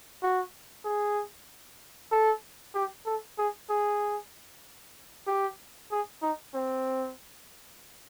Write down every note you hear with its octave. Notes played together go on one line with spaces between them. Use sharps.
F#4
G#4
A4
G4
A4
G#4
G#4
G4
G#4
D#4
C4